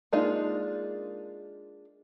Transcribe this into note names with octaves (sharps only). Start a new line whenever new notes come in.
G#3 A#3 D4 D#4 F4